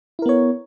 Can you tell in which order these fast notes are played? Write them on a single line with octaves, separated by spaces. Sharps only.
E4 A#4 B3 C#5